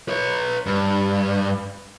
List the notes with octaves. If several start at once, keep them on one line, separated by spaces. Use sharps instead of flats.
B4 C#5
G2